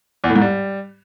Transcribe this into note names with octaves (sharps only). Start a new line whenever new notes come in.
E2
A2
G#2
G3